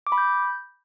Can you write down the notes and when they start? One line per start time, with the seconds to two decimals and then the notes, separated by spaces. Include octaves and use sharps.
0.07 D6
0.12 B5
0.18 G6